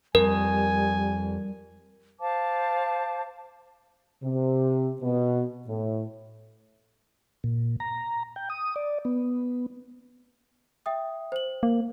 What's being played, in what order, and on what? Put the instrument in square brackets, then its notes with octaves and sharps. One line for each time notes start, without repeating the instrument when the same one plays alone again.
[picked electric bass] F2 [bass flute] G3 [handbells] A#4 [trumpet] G#5
[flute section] C5 F5 A5 D6
[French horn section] C3
B2
A2
[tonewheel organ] A#2
A#5
G5
D#6
D5
B3
[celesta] E5 G5 D#6
C5 F#7
[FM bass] A#3